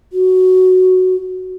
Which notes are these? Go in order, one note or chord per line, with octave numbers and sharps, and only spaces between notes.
F#4